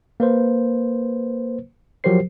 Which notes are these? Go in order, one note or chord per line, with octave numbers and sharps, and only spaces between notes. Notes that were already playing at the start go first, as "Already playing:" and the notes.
A#3 B4 C5
F3 F#3 G4 A#4 C5 C7